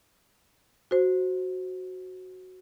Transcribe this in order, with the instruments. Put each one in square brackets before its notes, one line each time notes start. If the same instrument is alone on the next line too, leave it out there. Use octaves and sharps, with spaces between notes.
[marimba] F#4 C5